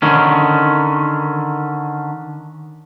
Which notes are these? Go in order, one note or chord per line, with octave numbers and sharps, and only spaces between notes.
D3 D#3 C#4